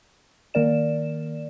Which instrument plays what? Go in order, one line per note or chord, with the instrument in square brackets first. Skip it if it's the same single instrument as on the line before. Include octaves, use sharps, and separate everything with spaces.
[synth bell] D#3 A#3 A#4 D5 E7